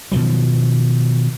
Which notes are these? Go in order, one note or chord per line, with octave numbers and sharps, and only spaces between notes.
B2 D#3 F3 F#3